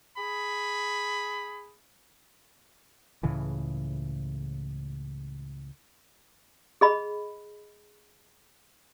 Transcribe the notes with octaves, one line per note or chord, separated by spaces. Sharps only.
G#4 B5
C#2 A2 C#3 E3
G#4 D#5 B5